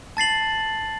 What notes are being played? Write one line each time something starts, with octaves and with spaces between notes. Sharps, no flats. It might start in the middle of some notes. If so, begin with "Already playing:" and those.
A5 A6 C7 F#7